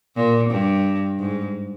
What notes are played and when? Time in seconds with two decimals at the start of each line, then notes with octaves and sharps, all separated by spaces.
0.16 A#2
0.49 G2
1.19 G#2